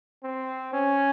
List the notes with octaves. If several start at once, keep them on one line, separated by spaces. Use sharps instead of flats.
C4
C#4